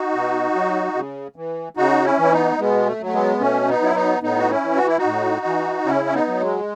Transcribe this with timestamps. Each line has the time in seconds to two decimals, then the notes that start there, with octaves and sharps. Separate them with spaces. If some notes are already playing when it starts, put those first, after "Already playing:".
Already playing: D#4 F#4
0.14 B2
0.55 F#3
0.95 C#3
1.36 E3
1.77 C#3 D#4 F#4
2.04 C#4 E4
2.18 E3 E4
2.32 B3 D#4
2.59 B2 G#3 B3
2.86 A3
3.00 F#3
3.06 A3
3.13 G#3 B3
3.41 B2 A3 C#4
3.68 B3 D#4
3.82 F#3 E4
3.95 B3 D#4
4.22 A2 B3 D#4
4.39 F#4
4.50 C#4 E4
4.64 E3
4.77 F#4
4.87 E4
4.98 D#4 F#4
5.05 A2
5.46 E3
5.86 C#3 C#4 E4
6.05 C#4
6.13 B3 D#4
6.27 F#3
6.41 G#3